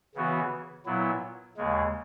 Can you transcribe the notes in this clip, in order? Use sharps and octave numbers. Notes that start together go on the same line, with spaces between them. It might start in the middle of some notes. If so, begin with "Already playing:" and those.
C#3 E3 B3 F#4
A#2 F#3 B3 E4
D#2 C#3 G#3